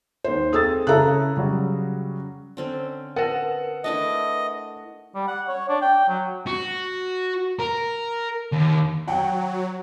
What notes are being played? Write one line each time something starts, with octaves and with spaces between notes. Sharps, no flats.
D#2 C5
C4 G#4 A4 D#6 E6 A6
C#3 E4 A4 C#5 A#5 F#6
C#3 F#3 G3 F#4
D3 C4 C#4
A#4 B4 F#5
A3 D4 E4 D#5
G3
F#5
C#5
D4
G5
F#3
F#4
A#4
D#2
F#3 F#5 G5